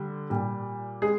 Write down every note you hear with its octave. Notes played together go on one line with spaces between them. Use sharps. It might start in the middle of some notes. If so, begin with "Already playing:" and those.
Already playing: D3 G3
A#2 G3
G#3 G#4